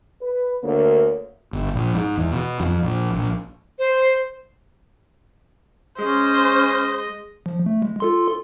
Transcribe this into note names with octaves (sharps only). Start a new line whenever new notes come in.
B4
D2 D3 A#3 A#4 C#5
G1
A#1
G#2
E2
B2
F2
A#1
A#1
C5
G#3 C#4 C5 D#5
F3
A3
G#3
F4 A4 C6